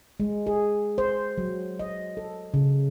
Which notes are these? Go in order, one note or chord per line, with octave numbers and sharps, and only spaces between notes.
G#3
G#4
C5
F#3
D#5
A4
C#3